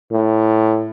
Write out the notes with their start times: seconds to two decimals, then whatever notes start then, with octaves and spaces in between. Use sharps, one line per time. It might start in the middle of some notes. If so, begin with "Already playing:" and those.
0.11 A2